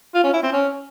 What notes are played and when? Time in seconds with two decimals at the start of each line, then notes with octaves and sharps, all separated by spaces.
0.14 F4
0.24 C#4
0.33 E4
0.43 C4
0.53 C#4